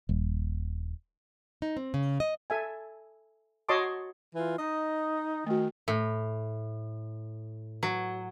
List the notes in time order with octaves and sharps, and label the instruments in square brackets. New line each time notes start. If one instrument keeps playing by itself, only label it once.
[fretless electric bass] D#1
[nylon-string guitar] D#4
C4
C#3
D#5
[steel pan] A4 E5 G#5
F#4 C#5 D#5 A5 C6 D6
[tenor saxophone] E3 [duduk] F4
[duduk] D#4 [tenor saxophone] D#5
[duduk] D#3 [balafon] A3 F#4
[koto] A2
F#3